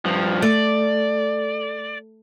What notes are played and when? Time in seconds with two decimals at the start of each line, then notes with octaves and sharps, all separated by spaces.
0.05 G2 F3
0.42 A3 D5